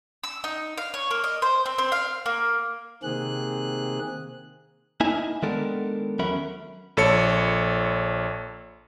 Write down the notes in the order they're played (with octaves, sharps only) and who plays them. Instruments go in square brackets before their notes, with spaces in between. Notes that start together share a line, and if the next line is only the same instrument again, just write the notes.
[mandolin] E6
D#4
F5
C#5
A#3
D#5
C5
C4
C4
F5
A#3
[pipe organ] C3 D#3 A#3 C4 G#4 F#6
[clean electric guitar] A#3 D#4 E4 E5 G#5
D#3 G#3 B3 D4 A4 A#4
E2 F#3 C#4 A#4 E5 B5
[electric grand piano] A#1 A4 C#5 C#7